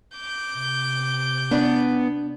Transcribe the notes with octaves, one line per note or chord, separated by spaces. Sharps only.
D6 G6
C3
B3 D4